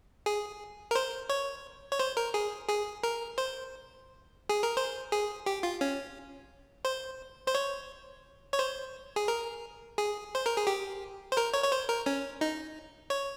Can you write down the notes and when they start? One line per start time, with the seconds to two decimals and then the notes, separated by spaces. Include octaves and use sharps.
0.26 G#4
0.91 A#4
0.95 C5
1.29 C#5
1.92 C#5
1.99 C5
2.17 A#4
2.34 G#4
2.69 G#4
3.03 A#4
3.38 C5
4.49 G#4
4.63 A#4
4.77 C5
5.12 G#4
5.46 G4
5.63 F4
5.81 C#4
6.85 C5
7.47 C5
7.55 C#5
8.53 C#5
8.59 C5
9.16 G#4
9.28 A#4
9.98 G#4
10.35 C5
10.46 A#4
10.57 G#4
10.67 G4
11.32 C5
11.37 A#4
11.54 C#5
11.64 C#5
11.72 C5
11.89 A#4
12.06 C#4
12.41 D#4
13.10 C#5